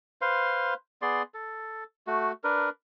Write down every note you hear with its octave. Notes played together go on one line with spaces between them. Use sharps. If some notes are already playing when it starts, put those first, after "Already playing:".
B4 C5 F5 C6
B3 G#4 D5 C6
A4
A3 F#4
D4 A#4 B4